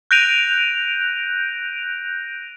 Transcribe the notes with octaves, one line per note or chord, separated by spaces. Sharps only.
F#6 G6 A#6 D7 D#7 F7